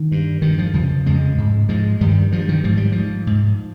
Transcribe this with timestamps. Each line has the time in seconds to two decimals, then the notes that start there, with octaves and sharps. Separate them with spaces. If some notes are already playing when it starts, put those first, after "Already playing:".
Already playing: D#3
0.12 G2
0.42 G2 D#3
0.59 F3
0.74 F2 C#3 F3
1.06 F2 C#3 F3 G#3
1.38 G#2
1.69 G#2 F3 G#3
2.01 G2 D#3 G3
2.32 G2 F3
2.49 D#3
2.64 G#2 F3
2.77 G3
2.92 G#2 F3
3.27 G#2